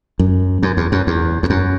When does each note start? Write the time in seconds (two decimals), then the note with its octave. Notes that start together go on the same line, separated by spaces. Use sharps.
0.19 F#2
0.63 F#2
0.77 E2
0.92 F#2
1.07 E2
1.43 E2
1.50 F#2